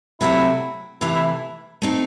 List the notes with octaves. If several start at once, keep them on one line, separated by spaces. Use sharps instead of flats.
C3 F#3 A3 C4 E4 F#4
C3 E3 A3 E4
E4
A3 C4 D#4